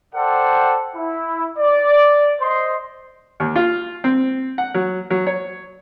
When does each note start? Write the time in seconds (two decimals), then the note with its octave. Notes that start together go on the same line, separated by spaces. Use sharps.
0.15 A4 C5 D5 F#5 G5
0.96 E4
1.59 D5
2.41 C5 D#5 C6
3.40 D#2
3.56 F4
4.04 C4
4.58 F#5
4.74 F#3
5.10 F#3
5.27 C#5